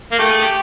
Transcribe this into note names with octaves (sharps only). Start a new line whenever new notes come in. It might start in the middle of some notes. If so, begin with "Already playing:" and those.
A#3
A3 G4
G#4
G4